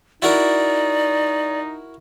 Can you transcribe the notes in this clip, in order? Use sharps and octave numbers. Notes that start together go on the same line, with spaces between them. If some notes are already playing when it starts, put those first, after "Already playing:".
D#4 E4 F#4 A#4 D5